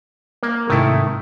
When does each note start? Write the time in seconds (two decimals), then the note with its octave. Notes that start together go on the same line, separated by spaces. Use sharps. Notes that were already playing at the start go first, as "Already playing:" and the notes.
0.43 A#3
0.70 G#2 C3 D#3 A3 E4